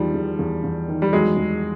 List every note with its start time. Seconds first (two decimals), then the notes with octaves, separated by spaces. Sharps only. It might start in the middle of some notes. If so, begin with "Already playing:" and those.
Already playing: E2 D#3 F3 G3
0.14 E2
0.39 E2
0.64 E2
0.88 D#3
1.02 G3
1.13 E2 F#3 G#3
1.37 E2